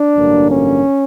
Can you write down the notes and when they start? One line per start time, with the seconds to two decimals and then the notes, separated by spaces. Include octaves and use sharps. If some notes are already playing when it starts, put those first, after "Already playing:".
Already playing: D4
0.16 A1 G2 D3 F#3 A#3
0.49 C#4